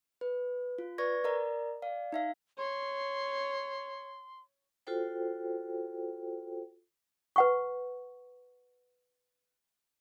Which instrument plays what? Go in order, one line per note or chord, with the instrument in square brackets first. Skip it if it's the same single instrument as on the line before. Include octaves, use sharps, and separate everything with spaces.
[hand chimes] B4
F4
B4 D5 C#6 G#6 A#6
A#4 D5 D#5 A#5
D5 F5
D#4 E5 F5
[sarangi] C#5 [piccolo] C6
[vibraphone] F4 F#4 A4 C5 G5
[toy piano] B4 F#5 C#6